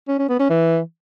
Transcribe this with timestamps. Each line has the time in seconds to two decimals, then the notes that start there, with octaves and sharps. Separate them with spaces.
0.08 C#4
0.19 C#4
0.29 B3
0.40 C#4
0.50 E3